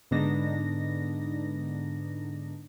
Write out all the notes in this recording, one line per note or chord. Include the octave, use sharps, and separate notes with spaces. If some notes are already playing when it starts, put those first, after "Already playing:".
G#2 D3 B3 D4 D#4 A#6